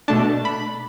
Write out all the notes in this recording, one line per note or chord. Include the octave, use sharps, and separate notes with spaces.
B2 A3 D4 A5
B5